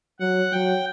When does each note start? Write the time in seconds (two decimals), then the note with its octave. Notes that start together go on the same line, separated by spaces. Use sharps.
0.20 F#3 F#5
0.52 F#3 G5